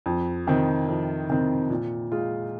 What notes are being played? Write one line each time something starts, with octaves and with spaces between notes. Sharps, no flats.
F2
C3 D#3 C4
F2
C3 D#3 C4
A#2
G#3 F4 G#4